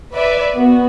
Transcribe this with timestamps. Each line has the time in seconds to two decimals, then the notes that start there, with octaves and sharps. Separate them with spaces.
0.15 B4 D5 E5
0.55 B3 F#4